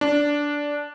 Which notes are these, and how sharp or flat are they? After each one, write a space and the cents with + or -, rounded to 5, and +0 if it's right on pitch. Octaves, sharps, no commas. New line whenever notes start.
D4 -10